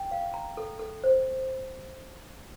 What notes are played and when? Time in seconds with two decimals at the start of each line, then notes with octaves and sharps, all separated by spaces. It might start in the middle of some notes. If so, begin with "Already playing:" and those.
Already playing: G5
0.11 F5
0.34 A#5
0.57 A4
0.79 A4
1.04 C5